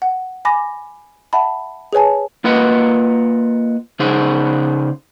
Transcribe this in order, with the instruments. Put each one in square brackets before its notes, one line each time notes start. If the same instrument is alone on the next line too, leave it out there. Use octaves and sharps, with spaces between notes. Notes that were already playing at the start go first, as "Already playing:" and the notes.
[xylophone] F#5
G#5 B5 D6 A#6
E5 F#5 A5 B5
G#4 B4 C#5 G#5 A5
[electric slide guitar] A#3 F4 B4 D#5 F#5
C#3 D#4 G#4 C5 F#5